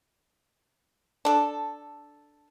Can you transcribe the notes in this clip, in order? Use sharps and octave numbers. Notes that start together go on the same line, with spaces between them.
D4 A4